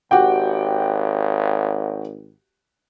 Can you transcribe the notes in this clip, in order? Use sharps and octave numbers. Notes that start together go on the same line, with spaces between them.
G#1 F#4 G4 G5